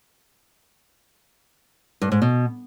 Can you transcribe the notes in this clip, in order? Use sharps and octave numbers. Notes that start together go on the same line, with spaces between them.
G2
G#2
B2